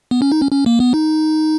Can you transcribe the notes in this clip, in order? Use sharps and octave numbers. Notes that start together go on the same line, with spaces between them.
B3
C#4
D#4
C#4
C#4
A#3
B3
D#4